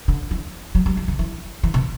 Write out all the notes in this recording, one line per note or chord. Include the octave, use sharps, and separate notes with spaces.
D3
E3
F#3
G3
E3
D3
E3
E3
B2